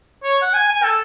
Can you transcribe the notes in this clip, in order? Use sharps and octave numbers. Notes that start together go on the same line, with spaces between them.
C#5
F#5
G#5
G#5
A4